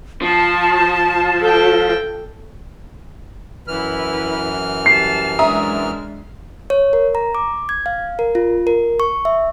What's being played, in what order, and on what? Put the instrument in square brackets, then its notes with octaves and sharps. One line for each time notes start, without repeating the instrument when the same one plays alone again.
[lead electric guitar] F3 [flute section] A5
[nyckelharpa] A4 G5
[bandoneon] F#2 E3 F6 [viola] E4 B4
[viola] G3 A5 [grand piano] C7
[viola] G#3 D4 [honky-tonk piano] E5 A#5 D#6
[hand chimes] C#5
A#4
A#5
D6
G#6
F5
A#4
F4
A#4
C#6
E5